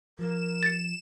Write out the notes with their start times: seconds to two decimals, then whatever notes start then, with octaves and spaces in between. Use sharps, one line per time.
0.19 F3 A#4 E7
0.63 A6 C#7